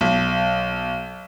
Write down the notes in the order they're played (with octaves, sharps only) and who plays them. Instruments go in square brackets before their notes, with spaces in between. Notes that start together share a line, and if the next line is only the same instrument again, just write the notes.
[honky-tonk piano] B1